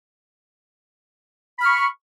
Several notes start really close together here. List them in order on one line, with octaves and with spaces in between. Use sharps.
B5 F6 C#6